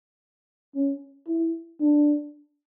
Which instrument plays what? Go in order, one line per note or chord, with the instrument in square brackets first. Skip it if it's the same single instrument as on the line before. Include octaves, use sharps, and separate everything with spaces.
[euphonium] C#4
E4
D4